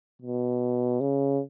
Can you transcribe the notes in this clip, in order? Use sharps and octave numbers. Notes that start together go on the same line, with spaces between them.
B2
C#3